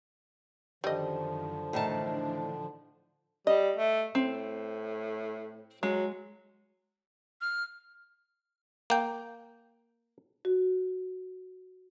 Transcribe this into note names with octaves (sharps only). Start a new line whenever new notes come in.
F#2 D3 D#3 F3 G3 D#5
A2 D#3 E3 D4 A5
G3 D#5
A3
A2 C4
F#3 G#3
F6
A#3 G5
F#4